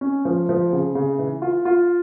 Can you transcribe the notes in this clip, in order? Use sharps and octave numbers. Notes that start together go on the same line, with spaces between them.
C#4
F3
F3
C#3
C#3
E3
F4
F4